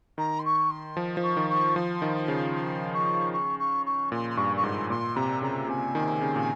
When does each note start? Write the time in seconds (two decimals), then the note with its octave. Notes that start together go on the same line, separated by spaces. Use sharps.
0.18 D#3 A#5
0.39 C6
0.45 C#6
0.70 C6
0.97 F3
1.17 F3
1.23 C#6
1.37 D#3
1.49 C#6
1.75 F3 C6
2.02 D#3
2.14 C6
2.28 C#3
2.55 C6
2.94 C#6
3.33 C#6
3.59 C#6
3.86 C#6
4.12 A#2 C6
4.30 C6
4.37 G2 C#6
4.56 C#6
4.63 G#2 C6
4.90 A#2 C6
5.16 C3 A#5
5.42 C#3 A#5
5.68 C3 G#5
5.95 D#3
6.21 C#3
6.36 A#2